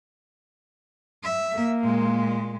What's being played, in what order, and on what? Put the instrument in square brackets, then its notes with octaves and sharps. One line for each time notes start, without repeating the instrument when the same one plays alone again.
[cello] E5
[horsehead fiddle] A#3
[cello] A#2 G#3